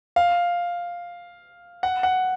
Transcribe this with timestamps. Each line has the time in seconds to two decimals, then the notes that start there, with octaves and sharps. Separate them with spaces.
0.16 F5
1.83 F#5
2.03 F#5